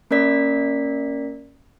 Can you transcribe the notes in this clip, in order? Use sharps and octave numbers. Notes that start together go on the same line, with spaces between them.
A#3 C#4 A#4 D5 B6